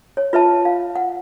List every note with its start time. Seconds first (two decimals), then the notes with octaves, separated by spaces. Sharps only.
0.17 C#5
0.33 F4 B4 E5 A5
0.65 F5
0.96 F#5